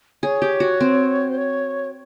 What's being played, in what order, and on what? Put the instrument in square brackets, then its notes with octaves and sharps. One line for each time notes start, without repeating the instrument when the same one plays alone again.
[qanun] G#4 [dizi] C#5
[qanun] G4
F#4
C4
[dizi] C5
C#5